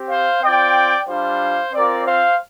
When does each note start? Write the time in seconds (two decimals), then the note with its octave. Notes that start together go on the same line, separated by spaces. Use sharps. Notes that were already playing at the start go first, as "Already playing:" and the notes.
Already playing: C4 G4
0.09 C5 F5
0.41 C4 F4 D5 G5
1.07 G3 D4 F4 C5 F5
1.73 C4 F4 A#4 D5
2.05 C5 F5